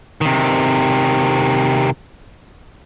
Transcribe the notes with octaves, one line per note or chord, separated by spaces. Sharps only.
C3 D#3